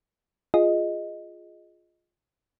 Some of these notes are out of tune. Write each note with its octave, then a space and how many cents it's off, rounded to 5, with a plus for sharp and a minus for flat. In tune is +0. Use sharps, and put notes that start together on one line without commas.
F4 +5 G#4 +0 D#5 +0